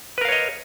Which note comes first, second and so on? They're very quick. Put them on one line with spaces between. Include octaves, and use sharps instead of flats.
B4 A#4 F5 C#5 D#5